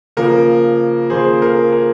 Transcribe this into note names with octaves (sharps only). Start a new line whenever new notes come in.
C#3 F3 A#3 A#4
C#3 F3 A#3 G#4 C5
A#4
A#4